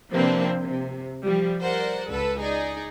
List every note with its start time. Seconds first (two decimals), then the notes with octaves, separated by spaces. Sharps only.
0.12 C3 F3 A#3 C4 D4 B4
0.60 C3
1.24 F3 G3
1.60 A#4 C5 D5 F#5
2.08 C#2 A4 B4
2.40 D#4 G#4 D5